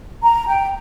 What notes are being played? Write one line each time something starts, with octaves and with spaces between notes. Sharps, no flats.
A#5
G5